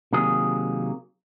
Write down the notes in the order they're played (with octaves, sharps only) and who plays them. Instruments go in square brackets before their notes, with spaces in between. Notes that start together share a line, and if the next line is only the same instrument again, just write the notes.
[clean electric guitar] C3 D#3 F#3 A#3 G#4